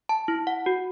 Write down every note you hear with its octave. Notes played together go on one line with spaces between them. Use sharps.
A5
E4
F#5
F#4